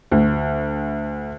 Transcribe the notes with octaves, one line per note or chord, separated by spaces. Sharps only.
D2